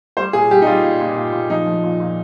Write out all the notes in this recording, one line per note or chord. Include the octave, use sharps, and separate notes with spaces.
G3 C5
A#2 G#4
G3 G4
D#4
G3 F4
A#2
A#2
A#2
A#2
F3 D#4
F3
A#2
A#2